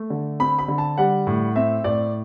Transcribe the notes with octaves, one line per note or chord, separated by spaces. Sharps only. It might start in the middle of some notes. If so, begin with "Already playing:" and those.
Already playing: A3
D3
C4 B5
B5
D3
A5
G3 F#5
A2
C4 E5
A2 D5